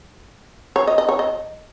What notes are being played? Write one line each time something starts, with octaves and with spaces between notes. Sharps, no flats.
C#5
D#5
D#5
C#5
D#5